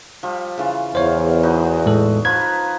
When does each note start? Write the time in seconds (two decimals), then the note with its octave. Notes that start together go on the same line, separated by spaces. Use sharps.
0.23 F3 G3
0.58 C#3 E3 F4
0.95 E2 C5 C#5 F5
1.43 D#4 F#4 B5
1.86 A2 G#3 A4
2.25 F3 B4 A#5 G#6